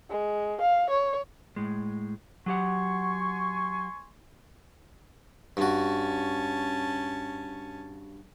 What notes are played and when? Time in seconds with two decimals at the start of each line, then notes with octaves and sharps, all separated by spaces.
0.10 G#3
0.61 F5
0.90 C#5
1.56 A2 G#3
2.46 F#3 G4 F#5 G#5 C6 C#6
5.57 G2 C#4 F#4 A5